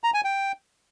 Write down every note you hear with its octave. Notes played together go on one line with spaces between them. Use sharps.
A#5
G#5
G5